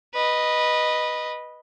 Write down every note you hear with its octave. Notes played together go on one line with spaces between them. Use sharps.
B4 D#5